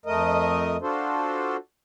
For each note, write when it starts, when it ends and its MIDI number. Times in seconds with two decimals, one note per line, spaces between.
0.06 0.77 41
0.06 0.77 57
0.06 0.77 70
0.06 0.77 75
0.82 1.57 62
0.82 1.57 65
0.82 1.57 66
0.82 1.57 69
0.82 1.57 72